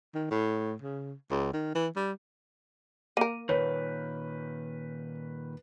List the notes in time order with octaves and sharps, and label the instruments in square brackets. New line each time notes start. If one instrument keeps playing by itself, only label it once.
[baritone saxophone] D#3
A2
C#3
C#2
D#3
E3
G3
[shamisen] A#3 A#4 [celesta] D#7
[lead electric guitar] A#2 D#3 [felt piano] B4 [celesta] C#5